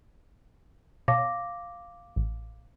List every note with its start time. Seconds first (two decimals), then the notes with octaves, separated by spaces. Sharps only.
1.08 B2 C#5 F5 A5 D6 A#6
2.16 A1